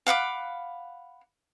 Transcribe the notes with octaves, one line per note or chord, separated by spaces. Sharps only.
F5 F#5 B5 D6